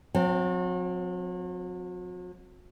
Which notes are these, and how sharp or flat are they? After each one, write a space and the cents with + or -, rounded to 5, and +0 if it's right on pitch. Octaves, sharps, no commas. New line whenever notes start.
F#3 -40 C4 +0